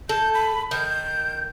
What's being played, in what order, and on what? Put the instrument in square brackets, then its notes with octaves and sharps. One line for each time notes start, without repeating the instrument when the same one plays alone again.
[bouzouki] A4 [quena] G6
[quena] B5
[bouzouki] D#3 [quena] G6